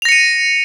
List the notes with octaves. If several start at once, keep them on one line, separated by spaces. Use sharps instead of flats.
A#6 C#7 D#7 F7